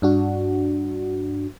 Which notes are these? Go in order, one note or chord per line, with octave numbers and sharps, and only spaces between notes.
G2 D4 F#4